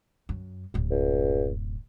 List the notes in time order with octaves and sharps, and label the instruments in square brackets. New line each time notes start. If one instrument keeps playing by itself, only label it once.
[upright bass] F#2
D1 F#2
[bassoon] C#2